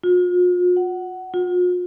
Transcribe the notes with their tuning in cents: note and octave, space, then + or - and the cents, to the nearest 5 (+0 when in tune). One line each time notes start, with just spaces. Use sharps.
F4 +40
F#5 +10
F4 +40